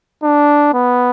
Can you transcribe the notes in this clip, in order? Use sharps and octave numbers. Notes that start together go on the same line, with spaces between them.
D4
B3